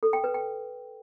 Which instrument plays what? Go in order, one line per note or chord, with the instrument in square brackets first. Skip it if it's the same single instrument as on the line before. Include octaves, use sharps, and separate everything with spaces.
[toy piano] A4
G5
B4
G5